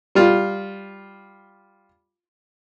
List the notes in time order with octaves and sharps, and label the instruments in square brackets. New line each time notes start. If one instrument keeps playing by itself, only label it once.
[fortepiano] G3 F4